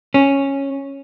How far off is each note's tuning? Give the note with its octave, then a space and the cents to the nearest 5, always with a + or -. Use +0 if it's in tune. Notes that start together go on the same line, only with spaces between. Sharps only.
C#4 -5